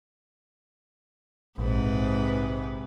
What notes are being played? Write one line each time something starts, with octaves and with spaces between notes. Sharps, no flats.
A#1 G#2 C3 B4